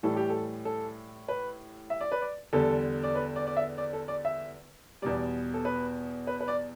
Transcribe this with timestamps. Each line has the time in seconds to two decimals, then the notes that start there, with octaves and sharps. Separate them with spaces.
0.03 A2 E3 G3 A4
0.16 G4
0.30 A4
0.65 A4
1.28 B4
1.90 E5
2.01 D5
2.12 B4
2.21 D5
2.53 E2 D3 G3 A4
3.03 D5
3.15 B4
3.36 D5
3.47 D5
3.57 E5
3.78 D5
3.93 A4
4.08 D5
4.25 E5
5.02 E2 B2 G3 D5
5.54 A4
5.65 B4
6.27 B4
6.40 B4
6.48 D5